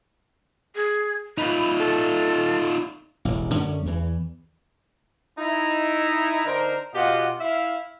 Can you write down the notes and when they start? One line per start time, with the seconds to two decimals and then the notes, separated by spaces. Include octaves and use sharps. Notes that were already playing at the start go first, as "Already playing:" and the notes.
0.76 G#4
1.38 D#4 F4 B5
1.79 A4
3.25 E1 A1
3.55 F#2 D3 A3 C#4
3.86 E2 E3
5.38 D#4 E4
6.46 D3 D4 D#4 A#4 C5
6.95 B2 F4 G4 D#5 F#5
7.40 E4 E5 F5